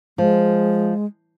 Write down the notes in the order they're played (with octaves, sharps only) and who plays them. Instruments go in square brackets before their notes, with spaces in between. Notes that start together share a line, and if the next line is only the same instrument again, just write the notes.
[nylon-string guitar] F3 [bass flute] G#3